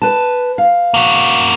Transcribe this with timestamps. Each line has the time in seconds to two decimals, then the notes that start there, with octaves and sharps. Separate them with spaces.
0.02 B4 A5
0.58 F5
0.94 A#3 F#4